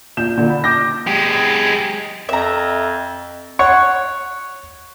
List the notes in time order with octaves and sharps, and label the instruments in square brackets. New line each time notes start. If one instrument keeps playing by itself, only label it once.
[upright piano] A#2 G6 E7
A#2 D3
B5
D6 G6 A#6
[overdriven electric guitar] G#3 G4
[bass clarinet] F2 [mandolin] E5 A#5
[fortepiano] C#5 F#5 C#6